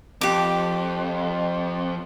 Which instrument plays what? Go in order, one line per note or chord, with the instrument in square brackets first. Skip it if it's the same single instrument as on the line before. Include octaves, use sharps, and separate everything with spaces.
[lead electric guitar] F2 [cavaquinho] G4 D6